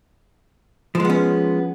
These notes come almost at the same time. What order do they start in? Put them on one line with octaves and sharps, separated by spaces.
F3 G#3 B3 C#4